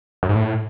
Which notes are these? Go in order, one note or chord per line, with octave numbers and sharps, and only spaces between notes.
F#2
G#2
A2